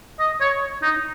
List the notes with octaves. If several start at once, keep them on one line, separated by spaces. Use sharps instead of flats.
D#5
C#5
D#4